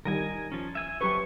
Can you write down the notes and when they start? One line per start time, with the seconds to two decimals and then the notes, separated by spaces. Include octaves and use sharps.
0.05 D#3 G3 A#4 D#5 G#5
0.52 F3 C#4
0.75 E5 G#5 E6
1.01 F#3 G4 B4 C5 E5 A5 C#6